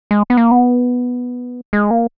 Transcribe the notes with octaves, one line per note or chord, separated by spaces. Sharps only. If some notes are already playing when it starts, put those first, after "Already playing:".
G#3
B3
A#3
B3
G#3
A#3